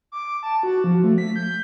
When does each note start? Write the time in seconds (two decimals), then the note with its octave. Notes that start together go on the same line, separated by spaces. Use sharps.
0.12 D6
0.43 A5
0.63 F#4
0.84 F3
1.04 A3
1.18 B6
1.36 G6